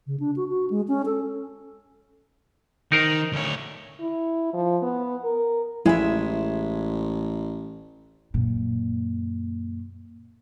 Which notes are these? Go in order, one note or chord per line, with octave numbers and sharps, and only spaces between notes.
C#3
D4
F#4
F#4
G#3
C#4
A4
D#3 D#4 A#4 C5
D2 C#5
E4
F3
B3
A#4
A1 G#3 E4 E5 G#5
F#2 A#2